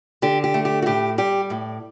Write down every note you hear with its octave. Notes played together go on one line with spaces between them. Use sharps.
D3 G4
G4
A3
G4
F#4
A2 G4
G3 G4
A2